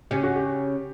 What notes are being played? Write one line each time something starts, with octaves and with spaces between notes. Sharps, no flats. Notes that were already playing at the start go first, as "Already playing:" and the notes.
C#3 C#4 G4
F#4
G4